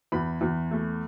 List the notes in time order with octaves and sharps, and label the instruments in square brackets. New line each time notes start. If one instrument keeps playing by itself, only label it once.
[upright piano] E2 B5
E2
A3